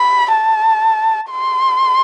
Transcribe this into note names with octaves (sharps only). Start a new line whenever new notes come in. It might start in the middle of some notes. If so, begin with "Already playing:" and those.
Already playing: B5
A5
C6